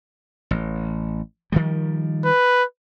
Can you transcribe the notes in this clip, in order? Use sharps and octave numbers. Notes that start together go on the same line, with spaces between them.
A1
D#3 F3 G3
B4